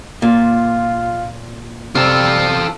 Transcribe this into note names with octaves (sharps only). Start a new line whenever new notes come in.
A#2 F4
C3 G3 F4 A4